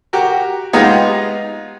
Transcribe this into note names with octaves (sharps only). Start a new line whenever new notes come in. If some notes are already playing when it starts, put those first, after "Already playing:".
F#4 G4 A#4
G#3 B3 D#4 F4 G4